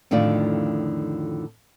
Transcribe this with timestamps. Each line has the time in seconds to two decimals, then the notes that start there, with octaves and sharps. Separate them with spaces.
0.11 F2 A2 D3 D#3 F4 D5